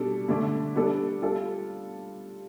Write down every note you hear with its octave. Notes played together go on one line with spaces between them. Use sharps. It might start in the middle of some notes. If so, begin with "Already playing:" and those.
Already playing: B2 G3 D4 A4
D3 A3 D4
G3 B3 D4 A4
G3 D4 F4 A4